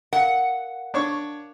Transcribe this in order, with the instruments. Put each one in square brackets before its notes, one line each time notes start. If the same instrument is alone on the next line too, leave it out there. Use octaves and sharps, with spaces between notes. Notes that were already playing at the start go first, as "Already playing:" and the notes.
[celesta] A#4 F5 [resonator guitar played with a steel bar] F#5
[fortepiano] D4 C#5 C#6